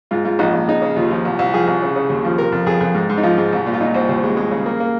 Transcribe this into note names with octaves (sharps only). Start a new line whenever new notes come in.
G#2 F4
G#2 F4
A#1 D#4
A#1
C#3 D#4
C#3
D#2 F4
F3
C2
C2
F3 G#4
C2
C#3
C#3
D#2
F3
C3 A#4
F2
F2 G#4
F2
G#2
G#2
D#4
F3 F4
G#2
C2
A#2
F4
A#2 D#4
C2 C5
D#2 C5
G#3
G#3
C#3
A#3
A#3